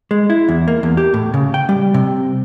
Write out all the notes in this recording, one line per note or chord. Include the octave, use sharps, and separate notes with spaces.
G#3
E4
E2
A#3
E2
G4
A2
C#3
G5
G3
C3